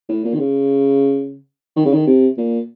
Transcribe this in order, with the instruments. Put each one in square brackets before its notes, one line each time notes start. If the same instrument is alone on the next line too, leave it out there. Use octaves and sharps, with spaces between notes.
[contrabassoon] A2
A#2
D#3
C#3
D#3
C#3
D#3
C3
A#2